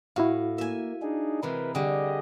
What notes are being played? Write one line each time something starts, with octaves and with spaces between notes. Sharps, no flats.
A2 E4 F#4 F5
A#3 E5 G#5
D4 D#4 G#4
C3 E3 G#3 A#4 B4
D3 G3 G4 G#4 D#5